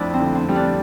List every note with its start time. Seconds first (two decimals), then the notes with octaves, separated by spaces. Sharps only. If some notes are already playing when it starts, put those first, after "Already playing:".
Already playing: F2 A3 D4 E4
0.14 C4
0.20 D3
0.35 C4
0.49 G3
0.55 D4